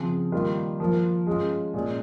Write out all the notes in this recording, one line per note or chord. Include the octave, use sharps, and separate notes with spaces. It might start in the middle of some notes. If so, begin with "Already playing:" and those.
Already playing: C#3 F3 C4
D#3 G3 A#3 F4
F3 A#3 F4 A#4
G#3 C#4 F4 G#4
A#2 G#3 C#4